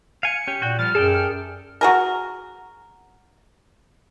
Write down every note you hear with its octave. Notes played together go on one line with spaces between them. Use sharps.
F5 G#5 C#7
C#4 G4
A#2 F#4 G5
F3 G3 F6 A6
F#2 G#4 A4 D5 G5
F6
F#4 G#4 A#4